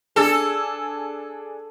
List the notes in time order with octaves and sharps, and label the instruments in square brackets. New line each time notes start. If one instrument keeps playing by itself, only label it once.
[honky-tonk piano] D4 G#4 E6 [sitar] A4